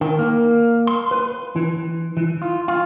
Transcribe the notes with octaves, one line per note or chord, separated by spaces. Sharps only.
D#3
A#3
C6
B4
E3
E3
F4
F4